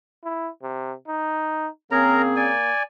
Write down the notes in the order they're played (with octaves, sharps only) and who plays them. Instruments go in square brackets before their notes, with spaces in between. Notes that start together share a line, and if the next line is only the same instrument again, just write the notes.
[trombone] E4
C3
D#4
[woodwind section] C#3 C4 G#4 [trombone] A#3 [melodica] A#4 A#5
[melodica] D5 G#5